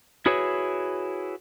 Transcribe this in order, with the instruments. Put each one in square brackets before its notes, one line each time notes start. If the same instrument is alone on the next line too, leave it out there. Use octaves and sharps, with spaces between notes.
[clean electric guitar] E4 F#4 G#4 B4 C#5